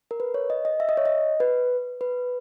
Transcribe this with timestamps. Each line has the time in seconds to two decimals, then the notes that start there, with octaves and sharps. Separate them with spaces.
0.11 A#4
0.20 B4
0.34 C#5
0.50 D#5
0.65 D#5
0.80 E5
0.89 D#5
0.97 C#5
1.06 D#5
1.40 B4
2.01 B4